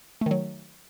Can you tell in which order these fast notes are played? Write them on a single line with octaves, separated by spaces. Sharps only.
A3 D#3 F#3